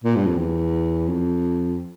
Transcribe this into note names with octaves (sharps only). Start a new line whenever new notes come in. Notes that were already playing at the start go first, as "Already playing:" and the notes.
A#2
G2
F2
E2
F2